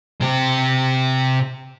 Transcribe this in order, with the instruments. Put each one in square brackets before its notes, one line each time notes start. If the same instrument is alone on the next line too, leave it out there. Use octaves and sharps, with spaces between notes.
[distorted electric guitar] C3 G4